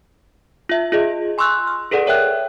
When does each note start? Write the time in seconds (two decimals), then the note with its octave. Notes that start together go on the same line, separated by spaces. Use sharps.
0.69 F4 E5
0.92 F4 G#4 D#5
1.38 G#5 C6 C#6 E6 F#6
1.67 F6
1.91 G#4 A4 B4 D5 F#5
2.06 A#4 C#5 E5 G5 F#6